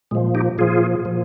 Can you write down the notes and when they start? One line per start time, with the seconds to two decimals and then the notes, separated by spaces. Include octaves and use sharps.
0.11 A#2 F3 G#3
0.35 D#4 G4
0.58 A#2 F3 F4 G#4
1.05 A#2 F3